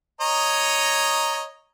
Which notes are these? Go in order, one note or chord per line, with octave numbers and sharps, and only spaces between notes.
C#5 D#5 A#5